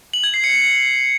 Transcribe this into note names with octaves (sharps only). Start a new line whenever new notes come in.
F#7
G#6
C7
C#7